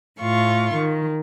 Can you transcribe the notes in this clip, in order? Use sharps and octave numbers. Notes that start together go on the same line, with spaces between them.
A2 F4 C#6
D#3